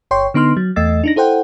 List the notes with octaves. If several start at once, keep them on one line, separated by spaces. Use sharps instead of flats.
G1 C#5 G5 C6 C#6
D3 B3 D#4 C6 F6
F#3
E2 A3 D#5 E6 A6
D4 D#4 A#6
E4 A4 C5 F#5 G5